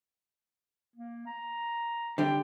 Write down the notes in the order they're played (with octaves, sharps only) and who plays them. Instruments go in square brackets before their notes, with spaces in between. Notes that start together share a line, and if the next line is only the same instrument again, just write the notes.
[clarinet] A#3
A#5
[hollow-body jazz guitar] D3 G3 [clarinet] G5